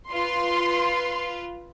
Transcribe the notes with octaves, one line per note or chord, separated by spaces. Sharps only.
F4 B4 C6